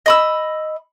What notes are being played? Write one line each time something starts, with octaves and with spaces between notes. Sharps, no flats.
D#5 B5 E6